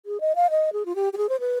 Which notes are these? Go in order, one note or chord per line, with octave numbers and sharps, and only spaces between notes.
G#4
D#5
F5
D#5
G#4
F4
G4
G4
G#4
C5
B4